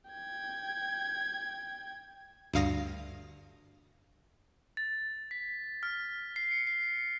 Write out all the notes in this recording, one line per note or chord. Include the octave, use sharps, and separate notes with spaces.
G5 G#6
D2 G2 F5 D#6 A#6
A6
B6
F6
C7
C#7
C7